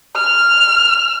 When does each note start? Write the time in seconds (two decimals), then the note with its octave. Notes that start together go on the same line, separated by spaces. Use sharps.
0.16 F6